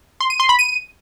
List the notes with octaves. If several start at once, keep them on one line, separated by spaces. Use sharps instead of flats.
C6
D#7
C6
B5
D#7